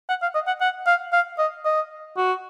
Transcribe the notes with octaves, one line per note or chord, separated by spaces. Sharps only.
F#5
F5
D#5
F#5
F#5
F5
F5
D#5
D#5
F#4